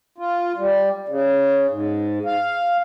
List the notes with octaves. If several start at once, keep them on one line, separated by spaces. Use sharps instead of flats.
F4
G3
C#3
G#2
F5